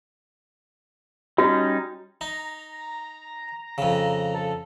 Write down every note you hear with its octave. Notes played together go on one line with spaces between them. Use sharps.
G3 C#4 D#4 F#4
D#4 A#5
F2 C#3
A4